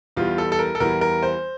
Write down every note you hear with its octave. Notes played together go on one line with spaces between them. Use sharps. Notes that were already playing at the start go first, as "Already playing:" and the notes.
E2 E3 G3 F4
A4
A4
A#4
A4
E2 E3 G3 A#4
A#4
C5